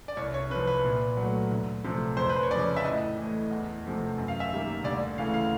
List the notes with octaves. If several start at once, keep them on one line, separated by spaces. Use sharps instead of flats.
D5
C2 C#5
C#5
C3 F3 B4
B4
A#2
F#3 A3
D2
C3 F3 A3
F2 C5
B4
C5
C#5
C#3 F3 D5
E5
A2 D#5
E3 A3
E2
C3 F3 A3
F#2
F5
E5
D#3 G3 A#3
D2 D5
C#3 E3 A3 F5
F5